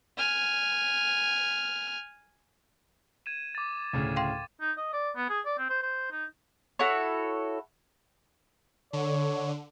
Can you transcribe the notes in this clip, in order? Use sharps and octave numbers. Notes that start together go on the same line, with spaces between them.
G#5 F6
G#6 D#7 E7
D6 A6
D2 A2 C#3
F5 G5 C6
D#4
D#5
D5
B3
G#4
D5
C4
C5
C5
D#4
E4 F#4 A4 C#5
D3 C#5